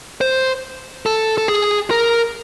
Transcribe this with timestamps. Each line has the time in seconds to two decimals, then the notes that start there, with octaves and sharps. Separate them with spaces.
0.21 C5
1.06 A4
1.38 A4
1.48 G#4
1.91 A#4